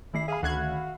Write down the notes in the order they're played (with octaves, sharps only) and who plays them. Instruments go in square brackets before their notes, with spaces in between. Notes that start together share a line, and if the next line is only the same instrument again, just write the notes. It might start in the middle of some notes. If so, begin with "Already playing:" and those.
[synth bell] D#3 A3 C7 [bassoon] E4
[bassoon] G#4 [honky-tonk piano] E5 F5 B5
[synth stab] D2 F#6 G#6 [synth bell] D#3 [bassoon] F#4